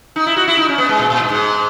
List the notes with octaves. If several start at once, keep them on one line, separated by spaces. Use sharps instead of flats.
D#4
E4
F#4
E4
D#4
C#4
B3
G#3
A#2
A#2
G#2
G#2